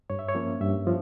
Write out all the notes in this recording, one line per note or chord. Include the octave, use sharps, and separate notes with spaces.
G2 C#5
E5
C#5
F3 A#3 C#4
G2 E5
F3